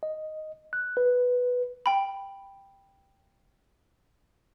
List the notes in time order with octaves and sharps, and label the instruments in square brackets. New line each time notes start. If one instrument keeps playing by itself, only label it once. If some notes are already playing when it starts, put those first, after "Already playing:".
[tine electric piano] D#5
F#6
B4
[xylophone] G5 B5